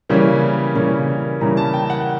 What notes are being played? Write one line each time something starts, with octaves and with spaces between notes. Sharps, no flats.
C#3 E3 G3 A#3 C#4
C#3 E3 G3 A#3 C#4
C#3 E3 G3 A#3 C#4 A#5
A5
G5
F#5